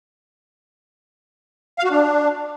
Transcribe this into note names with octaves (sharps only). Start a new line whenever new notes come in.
F5
F#4
D4